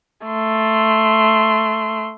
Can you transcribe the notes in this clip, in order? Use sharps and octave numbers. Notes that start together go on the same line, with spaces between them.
A3 C6